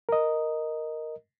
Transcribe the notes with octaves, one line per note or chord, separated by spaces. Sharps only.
A#4 D#5